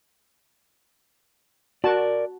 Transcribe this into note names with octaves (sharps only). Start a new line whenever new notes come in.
F#4 A#4 D5 A5